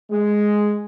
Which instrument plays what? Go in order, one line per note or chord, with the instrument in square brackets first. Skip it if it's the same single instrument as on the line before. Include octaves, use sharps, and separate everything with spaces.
[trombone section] G#3